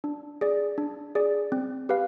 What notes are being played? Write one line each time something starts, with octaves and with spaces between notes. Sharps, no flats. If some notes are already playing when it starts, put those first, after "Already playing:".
D4
G#4 D5
D4
G#4 D5
C4
G4 B4 F5